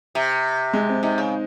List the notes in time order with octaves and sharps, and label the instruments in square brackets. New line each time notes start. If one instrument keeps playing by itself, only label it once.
[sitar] C3
[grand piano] G#3
C4
[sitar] C3 [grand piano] D#4
[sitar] C#3